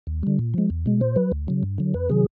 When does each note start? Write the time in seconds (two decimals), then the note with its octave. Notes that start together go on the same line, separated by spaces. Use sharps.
0.07 D#2
0.23 D3 G3
0.39 A#2
0.54 F3 G#3
0.70 E2
0.86 B2 G#3
1.01 A#2 C5
1.16 F#3 B4
1.32 D2
1.48 C#3 F#3
1.63 G2
1.78 D3 F#3
1.94 F2 B4
2.09 C3 D#3 F#3 G#4